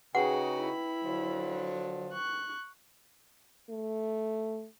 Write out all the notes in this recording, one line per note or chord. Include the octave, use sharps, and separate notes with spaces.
C#3 D#4 F#4 G#4 B4 F#5 G5
E4 B5
D3 F3 F#3
C#6 F#6
A3